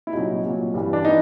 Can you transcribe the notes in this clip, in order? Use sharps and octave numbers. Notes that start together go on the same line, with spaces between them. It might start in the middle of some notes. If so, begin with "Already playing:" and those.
E4
C2 A#2 F#3 D#4
C2 A#2 F#3
G2 E3 G3
D4
E3 D#4